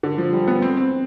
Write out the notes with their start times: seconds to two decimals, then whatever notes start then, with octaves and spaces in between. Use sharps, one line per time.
0.03 D3
0.18 F3
0.33 G3
0.48 B3
0.62 C4
0.77 C4